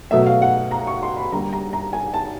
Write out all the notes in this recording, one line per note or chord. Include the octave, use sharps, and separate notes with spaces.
B2 F#3 A3 E5
F5
F#5
A#5
C#6
C6
B5
D3 G3 A#3 A#5
A#5
A#5
G#5
A5